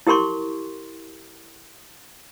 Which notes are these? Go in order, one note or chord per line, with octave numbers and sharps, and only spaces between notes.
E4 G4 A#4 C6 C#6